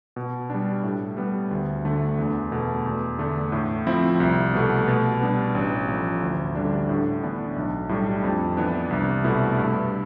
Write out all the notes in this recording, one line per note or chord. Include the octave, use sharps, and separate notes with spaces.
B2
G3 D4
A2
G3 B3
D2
D3 A3
E2
B2 A3
E2
D3 A3 D4
A2
F3 C4 E4
C2
B2 A3
B2
G3 B3 D4
A1
A2 F3
D2
D3 G3 D4
A2
E3 B3 D4
B1
A2 G3 D4
F2
E3 B3 D4
C2
B2 A3 E4
G2